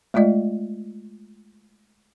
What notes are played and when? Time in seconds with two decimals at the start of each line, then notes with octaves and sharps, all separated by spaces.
0.14 G#3 A3 F4 D5 D#5